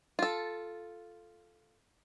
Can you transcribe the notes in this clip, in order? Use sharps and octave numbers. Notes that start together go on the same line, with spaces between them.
F4 A4